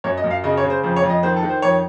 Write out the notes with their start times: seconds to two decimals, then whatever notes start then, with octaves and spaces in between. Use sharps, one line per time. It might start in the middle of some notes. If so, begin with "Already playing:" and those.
0.04 F#2 C#5
0.17 D#5
0.24 F#2
0.31 F5
0.44 C#3 D#5
0.57 C#5
0.64 C#3
0.70 C5
0.83 F2 C5
0.96 C#5
1.04 F2
1.10 D#5
1.23 D#3 C5
1.36 A4
1.43 D#3
1.49 C5
1.62 F2 C#5